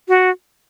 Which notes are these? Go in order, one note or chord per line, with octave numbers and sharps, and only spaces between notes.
F#4